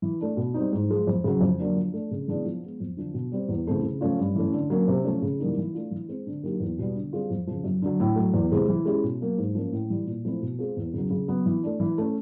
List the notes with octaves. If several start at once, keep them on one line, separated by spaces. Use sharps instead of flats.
E3
A3 D4
B2
G3 C4 D#4
G#2
F3 G#3
F2
C#3 F#3
F2
D3 F#3 A#3 D4
F3
A3 D4
C#3
E3 G#3 B3 D4
F3
G#3 B3
F2
D3 F3
B2
G3 C4
E2
C#3 E3 A3 C4
C#3
F3 A3 C#4 F4
G2
E3 A3 C#4
D3
F#3 A#3 C#4
C3
F3 A3 C#4
C#3
E3 G3 A#3 D#4
E3
A3 D4 F4
E3
G#3 C4
D3
F#3 A#3 D#4 G4
E2
B2 G3 B3
D3
G3 C4 F4 G#4
F2
C#3 F3
F#2
D3 F#3
A2
F#3 A3
E2
C3 E3 G#3
E3
G#3 C#4 E4 G4
B2
F#3 A#3
G#2
F3 A#3 C#4
A2
E3 G3
A#2
F3 A3 C4 E4
B2
G#3 C4 F4 G#4
E2
C#3 F#3
C#3
F#3 B3
E3
A3 D4
E3
A3 C#4